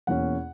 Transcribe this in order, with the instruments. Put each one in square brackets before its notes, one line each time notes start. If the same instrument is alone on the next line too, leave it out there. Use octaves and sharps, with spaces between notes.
[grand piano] E2 B2 A#3 C#4 F#5